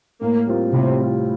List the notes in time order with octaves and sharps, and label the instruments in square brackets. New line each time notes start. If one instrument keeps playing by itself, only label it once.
[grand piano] A2 [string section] A#3
[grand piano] G3 C4 F4
[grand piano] A2 [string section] C3
[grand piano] G3 C4 F4